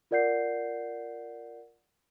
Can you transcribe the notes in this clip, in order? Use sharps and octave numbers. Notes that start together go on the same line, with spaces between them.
F4 A#4 D5 F#5 G6 C7